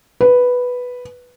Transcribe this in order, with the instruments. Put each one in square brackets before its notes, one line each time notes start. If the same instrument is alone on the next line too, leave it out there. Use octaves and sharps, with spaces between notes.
[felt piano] B4